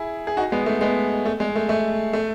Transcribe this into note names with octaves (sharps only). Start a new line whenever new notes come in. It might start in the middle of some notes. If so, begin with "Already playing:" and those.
Already playing: E4 G#4
G#4
D#4 F#4
G#3 B3
A3
G#3 B3
A3
G#3
A3
A3
A3